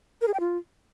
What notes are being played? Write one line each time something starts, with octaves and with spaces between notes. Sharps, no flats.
A#4
G#4
G5
F4